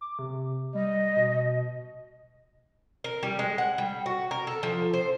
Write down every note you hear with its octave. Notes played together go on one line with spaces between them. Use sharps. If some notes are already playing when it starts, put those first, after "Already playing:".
D6
C3
G3 D#5
B2
A#4
G3
G#3
F#5
G3
F#4
A#4
A4
F3
C5